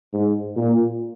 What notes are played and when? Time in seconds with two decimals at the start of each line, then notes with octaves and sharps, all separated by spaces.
0.13 G#2
0.57 A#2